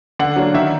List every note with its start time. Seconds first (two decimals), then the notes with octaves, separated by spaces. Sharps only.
0.19 D3 F#5
0.36 F#3 A#3 D4
0.54 D#3 E5